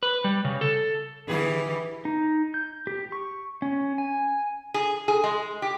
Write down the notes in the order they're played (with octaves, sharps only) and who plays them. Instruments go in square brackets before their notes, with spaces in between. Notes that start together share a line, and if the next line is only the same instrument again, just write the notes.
[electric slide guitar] B4
G3
C#3
A4
[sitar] D3 G4 G#4 [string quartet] E3
[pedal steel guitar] D#4
G6
G4
C#6
C#4
G#5
[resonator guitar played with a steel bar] G#4
G#4
G#3
G4